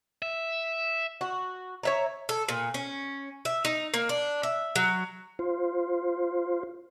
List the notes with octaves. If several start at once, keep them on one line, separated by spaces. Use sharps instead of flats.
E5
F#4
C#5 E5 A#5
A4
A#2
C#4
E5
D#4
A#3
D4
E5
F#3
F4 C5